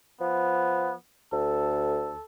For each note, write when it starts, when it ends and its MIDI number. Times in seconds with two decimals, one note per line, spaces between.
0.21 0.92 53
0.21 0.95 59
1.33 2.17 38
1.33 2.25 69